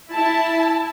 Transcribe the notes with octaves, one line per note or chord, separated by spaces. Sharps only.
E4 A5